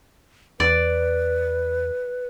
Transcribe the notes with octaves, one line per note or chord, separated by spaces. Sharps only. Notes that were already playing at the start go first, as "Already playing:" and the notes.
E2 B4 D5